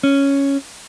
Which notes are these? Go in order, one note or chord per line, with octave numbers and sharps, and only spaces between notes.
C#4